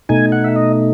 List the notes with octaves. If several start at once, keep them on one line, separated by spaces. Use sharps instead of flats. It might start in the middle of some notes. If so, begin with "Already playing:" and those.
B2 A3 D#4 G#5
F#5
E5
D#5